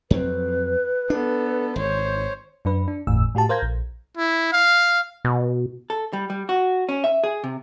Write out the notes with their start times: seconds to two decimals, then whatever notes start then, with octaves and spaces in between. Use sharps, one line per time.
0.11 F2 F#3 C4 B4
1.10 B3 D4 A4
1.76 G#1 C5 C#5
2.65 F#2 D4 B4
2.88 D4
3.07 G1 E2 A2 E6
3.35 A2 F#4 G4 A5
3.49 A#4 C5 F5 G6 G#6 A#6
3.62 A#1
4.17 E4
4.52 F5
5.25 B2
5.90 A4
6.13 G3
6.30 G3
6.49 F#4
6.89 C#4
7.04 E5
7.24 G#4
7.44 C3